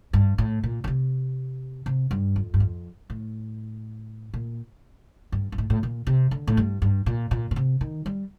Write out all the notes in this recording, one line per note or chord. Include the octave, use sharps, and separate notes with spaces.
G2
A2
A#2
D3
C3
C3
G2
F2
G2
F2
A2
A#2
G2
G2
A2
A2
A#2
C3
D3
A2
G2
G2
A#2
A#2
A#2
C3
D#3
G3